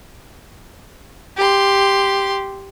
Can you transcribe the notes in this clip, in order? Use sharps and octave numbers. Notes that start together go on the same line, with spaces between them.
G4 C6